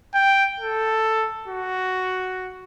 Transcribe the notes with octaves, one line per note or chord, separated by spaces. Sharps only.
G5
A4
F#4